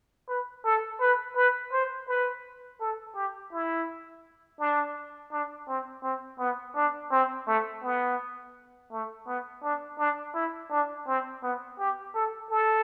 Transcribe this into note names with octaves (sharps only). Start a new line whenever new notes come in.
B4
A4
B4
B4
C5
B4
A4
G4
E4
D4
D4
C4
C4
B3
D4
C4
A3
B3
A3
B3
D4
D4
E4
D4
C4
B3
G4
A4
A4